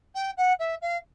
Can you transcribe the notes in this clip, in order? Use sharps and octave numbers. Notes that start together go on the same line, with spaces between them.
G5
F#5
E5
F5